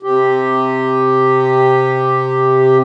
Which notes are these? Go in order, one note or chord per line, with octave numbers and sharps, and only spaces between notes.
C3 G4